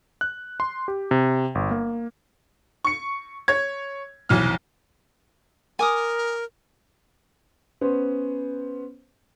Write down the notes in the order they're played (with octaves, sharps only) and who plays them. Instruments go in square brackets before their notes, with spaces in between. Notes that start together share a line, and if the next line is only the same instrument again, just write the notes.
[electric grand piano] F#6
C6
G4
C3
G1
A#3
[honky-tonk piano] C#6 C#7
C#5 G#6
F1 B1 E3 F6
[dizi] A#4 [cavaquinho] G#5 D6 D#6
[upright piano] B3 C#4 B4 C5